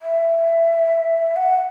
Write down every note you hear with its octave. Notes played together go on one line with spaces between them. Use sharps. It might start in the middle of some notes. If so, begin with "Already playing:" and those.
E5
F#5